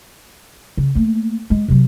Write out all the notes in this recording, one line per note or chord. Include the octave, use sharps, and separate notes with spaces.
C#3
A3 A#3
G#3
C3 F#3